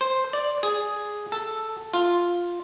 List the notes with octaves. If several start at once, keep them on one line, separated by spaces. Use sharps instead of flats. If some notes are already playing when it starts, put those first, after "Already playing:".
C5
D5
G#4
A4
F4